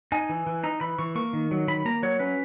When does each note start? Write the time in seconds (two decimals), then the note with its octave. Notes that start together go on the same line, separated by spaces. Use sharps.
0.12 D#4 G#5
0.29 E3
0.47 E3
0.64 D#4 A#5
0.81 E3 B5
0.99 E3 C#6
1.15 A#3 C#6
1.33 D#3
1.51 F#3
1.68 D#3 B5
1.85 A#3 A#5
2.03 F#3 C#5
2.19 C#4 B4